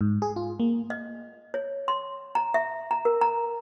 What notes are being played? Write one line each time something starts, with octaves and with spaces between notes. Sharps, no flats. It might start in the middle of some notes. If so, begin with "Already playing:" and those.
G#2
G#4
F4
A#3
D#5
C#5
C6
A#5
E5
A#5
A#4
A#5